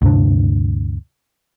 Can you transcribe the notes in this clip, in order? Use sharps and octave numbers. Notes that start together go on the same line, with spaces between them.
D2 G2 C3 D4